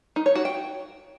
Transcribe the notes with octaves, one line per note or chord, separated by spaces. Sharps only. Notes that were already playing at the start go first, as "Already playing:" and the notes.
D#4
C#5
F#4
G5